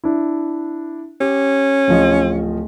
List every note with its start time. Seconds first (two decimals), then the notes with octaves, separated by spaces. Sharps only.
0.04 D4 E4
1.21 C#4 G4
1.88 D1 F3 D#5